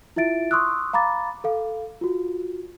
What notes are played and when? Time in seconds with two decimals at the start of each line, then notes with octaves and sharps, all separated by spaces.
0.16 E4 F4 E5 A6 D7
0.51 C6 C#6 D#6 E6 F#6
0.93 F5 A#5 B5 D6 A6
1.44 A4 F5
2.01 F4 F#4